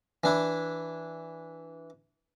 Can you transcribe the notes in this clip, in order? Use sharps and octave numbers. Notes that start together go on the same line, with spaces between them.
E3 D4 E4